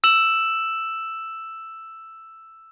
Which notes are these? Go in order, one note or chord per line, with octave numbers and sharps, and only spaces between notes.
E6 E7 F#7